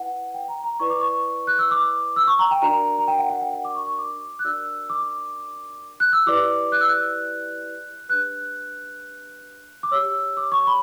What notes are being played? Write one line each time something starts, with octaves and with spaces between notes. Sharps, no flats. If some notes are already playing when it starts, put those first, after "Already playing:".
Already playing: E4 B4 F#5
G5
A#5
A#5
E4 B4 D5 C#6
D6
C#6
F#6
E6
D6
E6
C#6
A#5
G5
D4 F#4 A#4 D5 A#5
A#5
G5
F#5
F#5
G5
F#5
D6
C#6
C#6
D6
F#6
D4 F#4 A#4 D5 E6
D6
F#6
E6
E4 G4 B4 D5 D6
F#6
E6
F#6
D4 G4 B4 F#6
D6
G4 C#5 E6
D6
C#6
B5